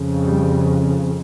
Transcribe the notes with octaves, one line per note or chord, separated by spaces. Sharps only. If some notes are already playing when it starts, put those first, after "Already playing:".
Already playing: F2 C#3
G3